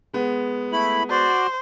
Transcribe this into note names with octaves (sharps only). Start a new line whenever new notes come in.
G#3 B3
A3 E4 B5
F#4 C5 D5